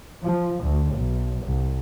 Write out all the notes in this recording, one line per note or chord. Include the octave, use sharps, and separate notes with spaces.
F3
D2
B1
C2